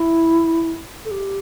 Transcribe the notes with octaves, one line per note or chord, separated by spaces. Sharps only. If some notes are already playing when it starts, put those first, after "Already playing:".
Already playing: E4
A4
G4